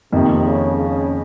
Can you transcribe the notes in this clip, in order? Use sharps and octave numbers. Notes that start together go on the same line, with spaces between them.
F2 C3 D#3 A#3 D#4
C#3
C#3